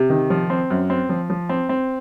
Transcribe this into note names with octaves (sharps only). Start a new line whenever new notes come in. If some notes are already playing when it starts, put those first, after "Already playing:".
Already playing: C3
D#3
F3
C4
F#2
C4
F3
F3
C4
C4